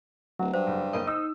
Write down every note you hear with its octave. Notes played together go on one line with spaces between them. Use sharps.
D1 F#3
G2 C5
F#1
F#1 A#3 D#5 G5
D#4 D#6 E6